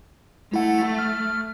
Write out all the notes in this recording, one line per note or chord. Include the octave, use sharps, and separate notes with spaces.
A3 E4 F#5
F6